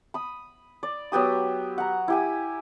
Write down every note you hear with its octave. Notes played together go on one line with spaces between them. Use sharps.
B5 D#6
D5
F#3 B3 G4 D#6
F#5 A#5
E4 G4 G#5